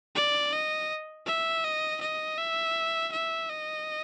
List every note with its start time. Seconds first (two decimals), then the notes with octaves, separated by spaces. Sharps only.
0.15 D5
0.53 D#5
1.27 E5
1.64 D#5
2.01 D#5
2.38 E5
3.12 E5
3.49 D#5